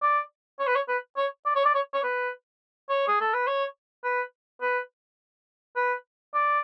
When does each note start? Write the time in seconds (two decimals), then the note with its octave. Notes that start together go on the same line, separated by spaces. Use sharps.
0.02 D5
0.59 C#5
0.67 B4
0.75 C#5
0.88 B4
1.17 C#5
1.46 D5
1.56 C#5
1.65 D5
1.75 C#5
1.93 C#5
2.04 B4
2.89 C#5
3.08 G#4
3.21 A4
3.34 B4
3.47 C#5
4.04 B4
4.61 B4
5.76 B4
6.34 D5